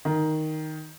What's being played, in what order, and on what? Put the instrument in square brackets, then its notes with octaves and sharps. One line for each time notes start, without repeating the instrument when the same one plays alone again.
[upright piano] D#3